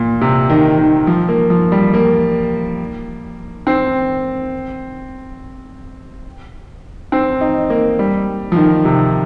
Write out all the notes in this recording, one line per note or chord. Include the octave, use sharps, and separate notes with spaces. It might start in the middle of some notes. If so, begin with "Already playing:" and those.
Already playing: A#2
C3
D#3
D#3
F3
A#3
F3
G3
A#3
C4
C4
D#4
A#3
G3
F3
D#3
C3